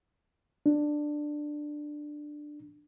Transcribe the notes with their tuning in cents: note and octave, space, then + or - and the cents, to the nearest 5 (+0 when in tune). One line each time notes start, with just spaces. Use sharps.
D4 +10